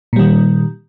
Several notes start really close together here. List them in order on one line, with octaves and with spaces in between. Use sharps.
A#2 G3 D#3